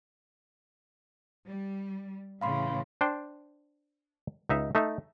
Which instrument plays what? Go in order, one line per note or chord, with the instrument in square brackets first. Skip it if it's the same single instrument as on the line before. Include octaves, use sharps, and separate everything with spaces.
[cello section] G3
[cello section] A2 C#3 E3 [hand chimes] F5 B5 C6
[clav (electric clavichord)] D4 C5 G5
C#2 D#4 E5
A3 D#4 E5